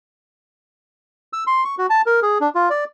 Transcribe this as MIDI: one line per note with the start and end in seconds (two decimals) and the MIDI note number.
1.33 1.44 88
1.47 1.64 84
1.65 1.75 85
1.78 1.86 66
1.90 2.02 81
2.06 2.20 70
2.22 2.38 68
2.41 2.50 62
2.55 2.69 65
2.70 2.84 74